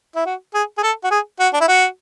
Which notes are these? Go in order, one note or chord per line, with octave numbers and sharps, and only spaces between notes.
E4
F#4
G#4
G#4
A4
F#4
G#4
F#4
D4
E4
F#4